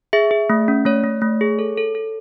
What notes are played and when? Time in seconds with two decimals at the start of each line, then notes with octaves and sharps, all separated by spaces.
0.13 G#4 E5
0.31 G#4
0.50 A3
0.68 C#4
0.85 A3 C#5
1.04 A3
1.22 A3
1.41 G#4
1.59 A4
1.77 A4
1.95 A4